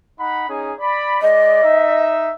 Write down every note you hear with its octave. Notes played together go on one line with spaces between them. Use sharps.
D#4 F#5 B5
C#4 D#4 G#4
D5 B5
G#3 D5 D#5
D#4 E5